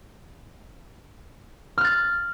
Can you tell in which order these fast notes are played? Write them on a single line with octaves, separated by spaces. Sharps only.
F6 F#6 A6